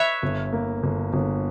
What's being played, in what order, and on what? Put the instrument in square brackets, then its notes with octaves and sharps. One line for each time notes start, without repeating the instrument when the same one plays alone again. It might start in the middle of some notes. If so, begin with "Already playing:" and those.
Already playing: [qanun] B4 C#5 E5
[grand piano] G1
A#3
G1
G1